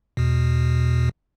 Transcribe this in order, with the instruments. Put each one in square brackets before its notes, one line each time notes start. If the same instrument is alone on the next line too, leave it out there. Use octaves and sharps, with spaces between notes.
[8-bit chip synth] E2 B2